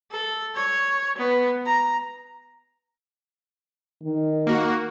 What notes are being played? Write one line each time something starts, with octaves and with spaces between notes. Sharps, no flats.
A4
C#5
B3
A#5
D#3
A#3 F#4